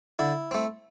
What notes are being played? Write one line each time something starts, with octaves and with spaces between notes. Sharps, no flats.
D3 E4
A3 C4